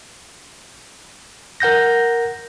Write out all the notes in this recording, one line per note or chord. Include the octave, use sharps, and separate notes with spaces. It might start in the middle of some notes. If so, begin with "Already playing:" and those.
A#4 F#5 G6 A#6